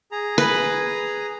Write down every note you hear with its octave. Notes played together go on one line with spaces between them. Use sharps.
G#4 A#5
B4